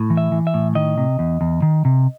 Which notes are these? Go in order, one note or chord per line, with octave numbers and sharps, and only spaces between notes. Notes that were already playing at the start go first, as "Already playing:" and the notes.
Already playing: A2
E3
E5
E3
E5
A2
D#3 D#5
C3
E2
E2
D#3
C3